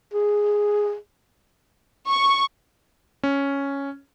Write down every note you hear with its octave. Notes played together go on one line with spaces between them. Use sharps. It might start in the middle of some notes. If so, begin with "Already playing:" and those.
G#4
C#6
C#4